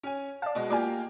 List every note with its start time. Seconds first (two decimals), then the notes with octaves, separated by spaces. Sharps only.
0.03 C#4 G#5
0.42 D5 F5 A5
0.55 B2 G#3 F#4
0.70 A#3 F4 G4 D5 G#5